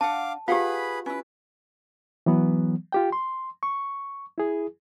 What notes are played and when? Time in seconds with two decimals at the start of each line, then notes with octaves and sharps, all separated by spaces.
0.01 D4 F5 F#5 A5 D6
0.48 F4 G4 G#4 B4 F5 F#5 B5
1.06 C#4 E4 B4
2.26 E3 F#3 B3
2.92 F4 G4 G5
3.12 C6
3.63 C#6
4.38 E4 G#4